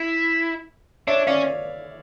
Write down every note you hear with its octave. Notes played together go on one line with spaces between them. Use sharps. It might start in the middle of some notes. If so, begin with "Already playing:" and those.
Already playing: E4
D4 C#5 E5
C#4 D5 F5